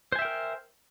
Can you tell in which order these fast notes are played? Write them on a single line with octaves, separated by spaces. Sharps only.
C5 G#5 E5 G5 A#4